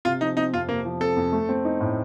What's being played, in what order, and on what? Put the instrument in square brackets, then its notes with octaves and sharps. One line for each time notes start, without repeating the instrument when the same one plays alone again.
[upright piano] C3 [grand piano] F4
[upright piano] F3 [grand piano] D#4
[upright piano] C4 [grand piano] D#4
[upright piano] F2 [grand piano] F4
[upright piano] C3 [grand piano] A#3
[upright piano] F3
[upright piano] C4 [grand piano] A4
[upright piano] F2
A3
C4
D#4
A2